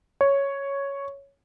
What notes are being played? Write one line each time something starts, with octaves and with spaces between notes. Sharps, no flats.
C#5